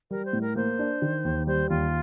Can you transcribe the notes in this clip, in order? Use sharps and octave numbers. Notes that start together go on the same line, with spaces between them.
G3 A#4
C5
A2
A#4
A#3 C5
D4
D#3
D#2
G3 C5
D#2 F4